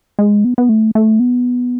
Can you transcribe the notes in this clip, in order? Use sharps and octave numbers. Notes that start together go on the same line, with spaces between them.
G#3
B3
B3
A3
A3
B3